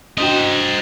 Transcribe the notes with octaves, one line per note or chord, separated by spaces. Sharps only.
D4 F#4 C5 D#5 G5